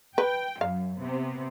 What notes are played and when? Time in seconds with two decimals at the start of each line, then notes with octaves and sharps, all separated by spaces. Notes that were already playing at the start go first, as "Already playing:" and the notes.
0.18 B4 G5
0.61 F#2 F5
0.99 C3 B3